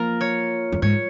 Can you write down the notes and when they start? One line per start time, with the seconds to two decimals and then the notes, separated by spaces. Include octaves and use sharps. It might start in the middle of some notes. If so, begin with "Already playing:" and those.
Already playing: F3 A#3 F4 A#4
0.21 C#5
0.72 F2
0.82 G#2 C#5